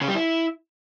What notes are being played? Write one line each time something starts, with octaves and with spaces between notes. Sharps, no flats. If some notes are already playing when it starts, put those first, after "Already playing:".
C#3
G3
E4